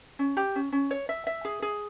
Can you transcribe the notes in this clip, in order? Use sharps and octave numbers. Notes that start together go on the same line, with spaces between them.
C#4
G4
C#4
C#4
C#5
E5
E5
G#4
G#4